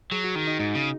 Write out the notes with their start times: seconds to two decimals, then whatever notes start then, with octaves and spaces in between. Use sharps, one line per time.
0.11 F#3 G#4
0.24 F#4
0.35 D#3 D#4
0.48 D#4
0.60 G#2 D#4
0.75 C#3